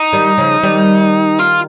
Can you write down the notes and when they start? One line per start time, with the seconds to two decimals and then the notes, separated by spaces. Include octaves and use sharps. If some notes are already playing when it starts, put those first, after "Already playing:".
Already playing: D#4
0.13 D#3 G3
0.38 C#3 F3
0.63 D#3 G3
1.39 F4